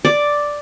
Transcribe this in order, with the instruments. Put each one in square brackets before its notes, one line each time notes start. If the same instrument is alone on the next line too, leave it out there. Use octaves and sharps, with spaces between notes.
[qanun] D5